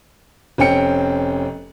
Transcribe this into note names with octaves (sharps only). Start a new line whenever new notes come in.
F1 C4 C#4 G5 C#7